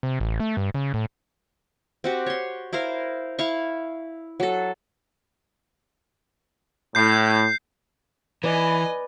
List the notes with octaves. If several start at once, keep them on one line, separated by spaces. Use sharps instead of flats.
C3
A1
A3
G2
C#3
A2
C4 F#4 G4
C#5 C6
E4 A#4 C5 F5
E4 F5 C#6
F#3 A4
A2 G6 C7
E3 B4 D5 D#5 G#5 B5